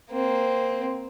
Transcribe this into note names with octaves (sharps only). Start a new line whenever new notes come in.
A#3 C4